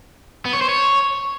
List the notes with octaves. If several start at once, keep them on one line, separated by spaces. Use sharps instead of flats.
B3
C#5
C5
C#5